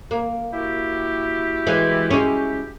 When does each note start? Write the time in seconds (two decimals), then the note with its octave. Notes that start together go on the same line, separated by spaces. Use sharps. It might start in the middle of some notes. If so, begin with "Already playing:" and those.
0.11 A#3
0.53 E4 F#4 G4
1.67 E3 G#3
2.10 G#3 C#4